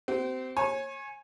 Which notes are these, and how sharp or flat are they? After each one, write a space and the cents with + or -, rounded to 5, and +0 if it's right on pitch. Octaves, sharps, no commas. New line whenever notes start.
C4 -20 G4 -45
C#5 -35 G#5 +0